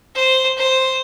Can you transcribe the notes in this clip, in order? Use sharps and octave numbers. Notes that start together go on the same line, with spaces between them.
C5
C5